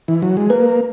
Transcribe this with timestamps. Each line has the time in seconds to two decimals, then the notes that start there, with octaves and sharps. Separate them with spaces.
0.08 E3
0.22 F#3
0.37 G#3
0.50 A#3 B4